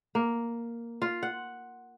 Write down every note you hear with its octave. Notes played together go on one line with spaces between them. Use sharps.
A#3
F4
F#5